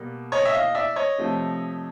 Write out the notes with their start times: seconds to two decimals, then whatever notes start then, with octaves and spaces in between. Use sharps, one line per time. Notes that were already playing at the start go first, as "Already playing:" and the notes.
Already playing: B2 G3 A#3
0.32 C#5 D#5
0.45 E5
0.53 D#5 F5
0.75 D5 E5
0.96 C#5 D#5
1.18 C3 F3 A3